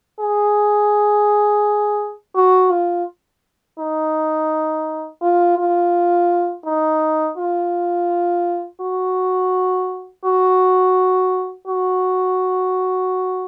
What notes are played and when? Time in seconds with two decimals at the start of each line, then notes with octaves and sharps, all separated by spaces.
0.20 G#4
2.36 F#4
2.72 F4
3.79 D#4
5.22 F4
5.58 F4
6.66 D#4
7.37 F4
8.81 F#4
10.25 F#4
11.67 F#4